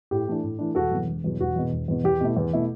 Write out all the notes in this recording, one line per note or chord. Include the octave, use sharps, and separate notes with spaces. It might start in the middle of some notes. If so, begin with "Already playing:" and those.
A2 G4
E3 A3 D4
A2
E3 A3 D4
E1 F#4 A4
E2 B2 F#3
E1
E2 B2 F#3
E1 F#4
E2 B2
E1
E2 B2
E2 G4
B2 A3 E4
E2
B2 A3 E4